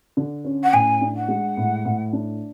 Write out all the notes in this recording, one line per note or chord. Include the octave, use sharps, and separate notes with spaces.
D3
C#4
F#5
A2 G#5
D4
F#5
G#3
A2
A2
D4